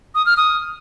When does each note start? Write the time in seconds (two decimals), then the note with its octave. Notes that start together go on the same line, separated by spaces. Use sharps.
0.15 D#6
0.26 F6
0.37 D#6